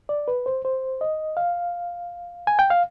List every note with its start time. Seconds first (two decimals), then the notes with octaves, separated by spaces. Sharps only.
0.09 D5
0.28 B4
0.46 C5
0.65 C5
1.01 D#5
1.37 F5
2.47 G#5
2.59 G5
2.70 F5